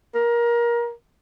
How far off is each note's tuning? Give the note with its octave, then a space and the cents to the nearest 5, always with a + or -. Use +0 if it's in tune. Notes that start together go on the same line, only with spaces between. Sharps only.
A#4 +20